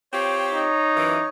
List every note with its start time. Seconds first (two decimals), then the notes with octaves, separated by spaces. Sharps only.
0.13 C4 F4 G4 C#5
0.52 D#4
0.96 F#2 E3